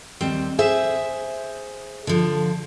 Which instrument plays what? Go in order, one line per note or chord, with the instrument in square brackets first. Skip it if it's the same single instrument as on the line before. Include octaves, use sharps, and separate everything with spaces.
[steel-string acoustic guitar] D#2 G3 C4
G#4 C5 E5
D3 F3